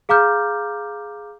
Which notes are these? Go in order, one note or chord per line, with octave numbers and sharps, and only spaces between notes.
G#4 F5 A#5 D6 F6 G6